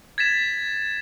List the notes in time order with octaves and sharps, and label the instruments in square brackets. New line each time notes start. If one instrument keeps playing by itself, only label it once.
[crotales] G#6 A6 B6 E7